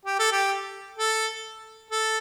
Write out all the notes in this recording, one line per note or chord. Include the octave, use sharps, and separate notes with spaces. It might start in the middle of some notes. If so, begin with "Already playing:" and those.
G4
A4
G4
A4
A4